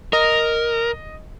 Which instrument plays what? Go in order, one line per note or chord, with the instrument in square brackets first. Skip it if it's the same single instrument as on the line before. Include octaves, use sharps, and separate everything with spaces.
[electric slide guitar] A#4 [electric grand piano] D#5